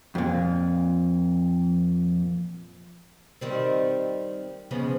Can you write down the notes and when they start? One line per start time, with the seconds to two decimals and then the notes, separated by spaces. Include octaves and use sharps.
0.15 F2 A#2
3.41 D#3 G3 C4
4.71 C#3 F3 B3